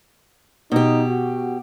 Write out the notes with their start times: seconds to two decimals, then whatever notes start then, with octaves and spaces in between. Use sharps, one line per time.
0.72 B2 D#4 G4
1.10 F#4